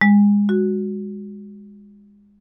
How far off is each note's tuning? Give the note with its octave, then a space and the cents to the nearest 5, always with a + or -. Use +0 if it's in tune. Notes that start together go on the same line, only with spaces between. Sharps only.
G#3 -25
F#4 -5